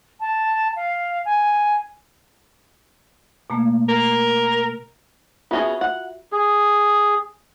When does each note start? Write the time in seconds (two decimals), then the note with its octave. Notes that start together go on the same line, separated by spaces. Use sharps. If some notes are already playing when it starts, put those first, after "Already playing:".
0.20 A5
0.76 F5
1.25 G#5
3.50 B2 A3 A#3
3.89 A#4
5.51 B3 C#4 F4 F#4 G#4 E5
5.81 F#5
6.32 G#4